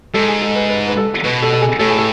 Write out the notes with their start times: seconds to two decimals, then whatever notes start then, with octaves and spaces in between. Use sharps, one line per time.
0.14 G#2 A4
0.28 G#4
0.42 A4
0.55 B4
0.69 B4
0.88 B4
0.97 A4
1.24 B2 B4
1.42 A4
1.53 A4
1.61 G#4
1.79 A2 A4
1.89 G#4
1.98 A4